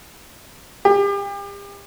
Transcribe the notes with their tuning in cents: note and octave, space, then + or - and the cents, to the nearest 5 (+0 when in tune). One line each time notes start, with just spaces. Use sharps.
G4 +40